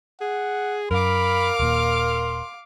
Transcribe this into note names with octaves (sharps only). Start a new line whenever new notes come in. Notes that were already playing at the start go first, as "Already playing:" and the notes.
G#4 F#5
F#2 A#4 F5 B5 D6
D#1 A#2 C6